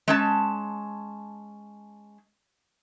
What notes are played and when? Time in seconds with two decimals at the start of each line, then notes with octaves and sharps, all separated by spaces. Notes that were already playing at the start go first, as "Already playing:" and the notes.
0.08 G#3 C#4 A5